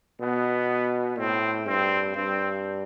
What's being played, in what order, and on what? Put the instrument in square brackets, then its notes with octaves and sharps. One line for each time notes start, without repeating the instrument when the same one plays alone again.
[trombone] B2 [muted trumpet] B3
[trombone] A2 [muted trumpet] C4
[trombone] G2 [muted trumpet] C4
[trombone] G2 [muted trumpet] C4